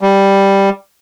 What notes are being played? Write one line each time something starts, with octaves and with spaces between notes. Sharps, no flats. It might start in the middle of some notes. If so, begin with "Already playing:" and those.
G3